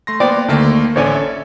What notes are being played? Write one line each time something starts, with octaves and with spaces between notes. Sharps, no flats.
A3 C6 A#6
A#3 B3 C5 D5 G5
D2 D#3 A3 A#3
A1 D3 C#4 C#5 D5 G#5
A4 E5